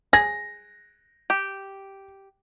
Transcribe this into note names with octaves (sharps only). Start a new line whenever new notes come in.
G#4 A#6
G4